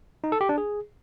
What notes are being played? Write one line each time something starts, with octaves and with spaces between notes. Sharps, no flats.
D#4
A4
G4
D4
G#4